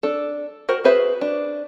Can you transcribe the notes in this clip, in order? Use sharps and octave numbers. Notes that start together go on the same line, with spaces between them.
D4 A4
F#4 A#4 C5
F#4 G#4 B4 C5 E5
D4